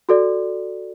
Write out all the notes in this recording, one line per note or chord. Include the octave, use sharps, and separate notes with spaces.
F#4 A4 D5